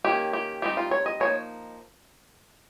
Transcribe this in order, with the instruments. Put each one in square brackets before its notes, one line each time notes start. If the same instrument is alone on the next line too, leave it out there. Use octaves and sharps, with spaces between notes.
[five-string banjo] D#3 A#3 C#4 G4
G4
G3 C4 D#4 G4
F4
C#5
D#5
F3 A#3 D#4 C#5